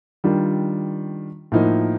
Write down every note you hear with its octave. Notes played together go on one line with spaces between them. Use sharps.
D#3 G3 D4 F4
A2 F3 A#3 D#4